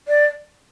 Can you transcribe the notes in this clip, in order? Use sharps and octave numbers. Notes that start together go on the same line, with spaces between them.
D5